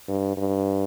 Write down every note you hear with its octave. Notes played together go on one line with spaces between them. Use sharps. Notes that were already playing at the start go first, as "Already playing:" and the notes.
G2
G2